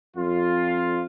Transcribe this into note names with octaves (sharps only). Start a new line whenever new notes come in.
F2 F4